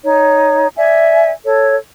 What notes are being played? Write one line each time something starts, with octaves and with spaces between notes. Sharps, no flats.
D#4 C#5
D5 E5 G#5
A4 C#5